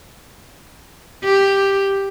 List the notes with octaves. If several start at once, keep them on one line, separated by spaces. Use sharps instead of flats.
G4